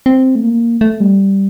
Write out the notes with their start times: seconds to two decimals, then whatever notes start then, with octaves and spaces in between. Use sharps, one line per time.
0.06 C4
0.35 A3
0.43 A#3
0.81 A3
1.00 G3